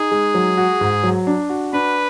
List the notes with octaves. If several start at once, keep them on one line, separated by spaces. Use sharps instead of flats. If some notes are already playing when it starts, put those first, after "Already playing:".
Already playing: D#4 G#4
G#3
F#3
F#4
G#2
F#3
D4
F#4
D4 B4